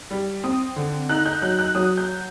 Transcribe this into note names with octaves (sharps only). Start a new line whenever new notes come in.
G3
C4 D#6
D3
D#4 F#6
G6
F#3 F#6
F#6
F#3 D#6
G6